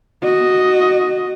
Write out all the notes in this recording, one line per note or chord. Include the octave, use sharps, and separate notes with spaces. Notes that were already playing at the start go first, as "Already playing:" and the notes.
F#4 D#5